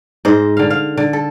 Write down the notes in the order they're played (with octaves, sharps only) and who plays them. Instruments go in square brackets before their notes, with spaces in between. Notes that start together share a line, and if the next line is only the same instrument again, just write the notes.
[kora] G#2 C5 D#5
D3 F5
F5
D3
A4